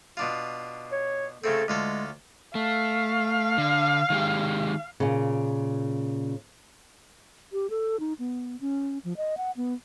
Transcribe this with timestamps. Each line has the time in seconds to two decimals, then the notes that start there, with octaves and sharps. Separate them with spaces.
0.17 B2 D4 F4
0.92 C#5
1.44 C#3 A3 C4 A4
1.68 D2 G#3 F4 A4
2.55 A3 F5
3.58 D3
4.10 D#3 G#3 G4
5.00 A#2 C#3
7.53 G4
7.70 A4
8.00 D#4
8.19 B3
8.61 C#4
9.05 F3
9.17 D#5
9.37 F#5
9.57 B3